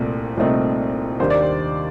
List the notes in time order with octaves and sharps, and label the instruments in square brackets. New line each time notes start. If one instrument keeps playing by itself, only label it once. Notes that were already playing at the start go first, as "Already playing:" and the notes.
Already playing: [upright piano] C2 A#2 A3 C4
C2 A#2 A3 C4 D#4
D#2 D#3 G3 D4 C5
D5
C5